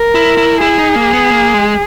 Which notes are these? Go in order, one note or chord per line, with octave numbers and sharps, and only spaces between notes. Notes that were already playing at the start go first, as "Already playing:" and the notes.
Already playing: A#4
E4
E4
E4 G#4
D#4
A#3
B3
A#3
G#3